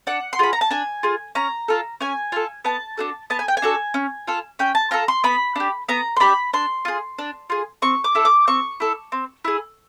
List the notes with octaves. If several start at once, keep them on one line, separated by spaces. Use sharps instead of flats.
D4 F#5
C6
F4 G#4 B5
A#5
A5
D4 G#5
F4 G#4
C#4 A#5
F4 A4
C#4 G#5
F4 A4
B3 A5
D4 F#4 A4
B3 A5
G#5
G5
G#5
D4 F#4 A4
C#4
F4 A4
C#4 G5
A5
F4 A4 A#5
C6
B3 B5
D4 G4
B3 A#5
C6
D4 G4 B5
D4 C6
F4 G#4
D4
F4 G#4
C4 C#6
D6
E4 A4
D6
C4 C#6
E4 A4
C4
E4 G#4